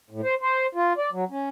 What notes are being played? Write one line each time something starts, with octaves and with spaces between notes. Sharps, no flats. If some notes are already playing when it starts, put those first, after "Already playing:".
A2
C5
C5
F4
D5
F#3
C#4